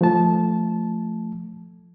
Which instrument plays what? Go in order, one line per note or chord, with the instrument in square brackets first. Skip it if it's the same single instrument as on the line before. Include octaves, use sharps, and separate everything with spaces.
[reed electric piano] F3 A3 A5